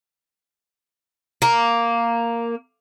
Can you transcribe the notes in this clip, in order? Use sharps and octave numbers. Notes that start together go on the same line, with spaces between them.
A#3